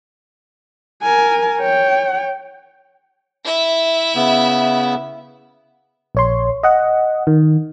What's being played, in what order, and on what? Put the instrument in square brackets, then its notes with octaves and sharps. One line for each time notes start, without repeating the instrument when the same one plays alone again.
[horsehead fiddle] A#4 G#5
C#5 G5
[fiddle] E4 E5
[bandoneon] C#3 B3
[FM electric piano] A#1 C#5 C6
D#5 F#5
D#3